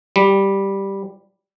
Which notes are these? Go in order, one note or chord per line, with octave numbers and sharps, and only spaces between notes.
G3